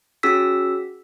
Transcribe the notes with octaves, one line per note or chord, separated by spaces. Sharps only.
C#4 F#4 G#4 E6 B6